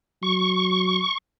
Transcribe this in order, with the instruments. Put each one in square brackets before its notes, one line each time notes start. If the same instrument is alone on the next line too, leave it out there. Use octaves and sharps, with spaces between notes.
[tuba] F#3 [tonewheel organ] C#6